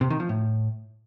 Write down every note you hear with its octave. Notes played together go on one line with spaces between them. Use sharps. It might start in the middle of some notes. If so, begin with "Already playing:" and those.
C3
D#3
F3
A2